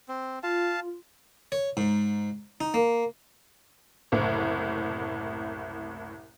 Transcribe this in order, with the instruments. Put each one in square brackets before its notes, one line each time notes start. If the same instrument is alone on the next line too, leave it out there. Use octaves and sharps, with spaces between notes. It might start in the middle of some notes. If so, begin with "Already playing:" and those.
[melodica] C4
[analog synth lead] F4 [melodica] F5 A5
[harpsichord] C#5
G#2
D#4
A#3
[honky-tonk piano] F#1 C2 A2